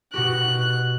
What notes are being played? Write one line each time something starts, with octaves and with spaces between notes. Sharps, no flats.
B2 F#4 G4 F#6